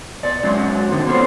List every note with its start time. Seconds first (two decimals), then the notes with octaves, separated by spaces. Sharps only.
0.23 B2 D5
0.43 F#3 G#3 C#4 F#4 D5
0.88 G#2 B2 D3 D#3
1.07 B3 C#4 F4 A4 C5 C#5